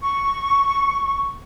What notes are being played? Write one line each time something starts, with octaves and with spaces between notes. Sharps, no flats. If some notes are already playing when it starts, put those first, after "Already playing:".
C#6